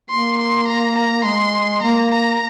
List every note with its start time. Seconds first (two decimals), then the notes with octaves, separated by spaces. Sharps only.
0.10 A#3 C6
0.39 C6
0.68 A#5
0.96 A#5
1.25 G#3 C6
1.83 A#3 A#5
2.11 A#5